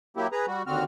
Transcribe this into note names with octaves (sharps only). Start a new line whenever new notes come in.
F#3 A#3 E4 G4
G#4 B4 A#5
G3 F#4
D#2 D3 C4 F#4 F6